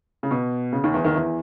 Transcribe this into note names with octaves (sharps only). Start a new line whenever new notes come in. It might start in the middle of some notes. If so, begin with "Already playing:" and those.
C#3
B2
C#3
D#2 D#3
E2 E3
D#2 D#3
E2 E3